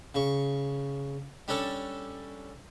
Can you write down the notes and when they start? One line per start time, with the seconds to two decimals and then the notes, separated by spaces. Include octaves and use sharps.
0.15 C#3 C#6
1.48 G3 C#4 D4 A4 C#5